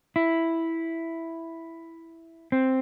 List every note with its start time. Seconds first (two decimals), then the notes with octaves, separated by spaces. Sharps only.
0.16 E4
2.52 C4